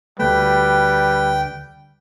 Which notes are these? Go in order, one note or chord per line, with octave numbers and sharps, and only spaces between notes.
D2 G3 A3 B4 G5